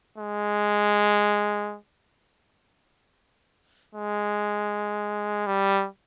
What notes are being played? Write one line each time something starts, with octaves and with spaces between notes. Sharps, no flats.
G#3
G#3
G3